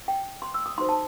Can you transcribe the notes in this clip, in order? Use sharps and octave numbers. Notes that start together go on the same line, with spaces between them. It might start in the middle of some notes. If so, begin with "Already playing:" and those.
G5
C6
E6
D#6
D#4 F#4 A4 C5 C6
A5